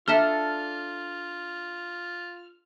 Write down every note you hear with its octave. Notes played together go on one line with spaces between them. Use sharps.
D4 F4 A4 E5 A5 A#5 F6 G7